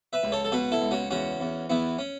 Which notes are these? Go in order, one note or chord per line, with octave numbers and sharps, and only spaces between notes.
B4 E5
C#2
A4 C#5
A4
B2 F#4 B4
E4 A4
C#2
C#4 F#4
E2 C#4 F#4
E2
E2 B3 E4
C#4